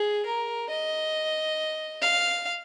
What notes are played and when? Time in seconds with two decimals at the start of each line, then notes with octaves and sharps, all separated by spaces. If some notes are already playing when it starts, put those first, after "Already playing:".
Already playing: G#4
0.26 A#4
0.69 D#5
2.02 F5